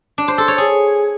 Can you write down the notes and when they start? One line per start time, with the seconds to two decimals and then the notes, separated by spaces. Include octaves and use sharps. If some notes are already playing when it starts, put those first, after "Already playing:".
0.18 D4
0.28 C5
0.38 A4
0.48 C#5
0.58 G#4